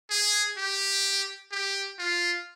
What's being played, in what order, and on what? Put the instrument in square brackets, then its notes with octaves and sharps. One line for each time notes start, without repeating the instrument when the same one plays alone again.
[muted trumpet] G#4
G4
G4
F4